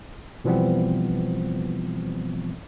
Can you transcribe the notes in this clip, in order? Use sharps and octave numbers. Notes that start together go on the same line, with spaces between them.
B2 E3 F3 G3 B3 C4